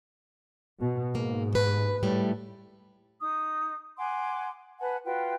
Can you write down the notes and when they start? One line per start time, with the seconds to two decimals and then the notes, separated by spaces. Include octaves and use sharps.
0.80 B2
1.15 G#2 A#3
1.53 D#2 B4
2.03 A2 G3 A3
3.20 D#4 D#6
3.97 F#5 G#5 C6 D6
4.79 B4 F#5 G#5 A5
5.05 F4 F#4 B4 G5